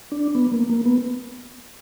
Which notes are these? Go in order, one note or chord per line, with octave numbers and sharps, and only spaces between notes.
D4
B3
A#3
A#3
B3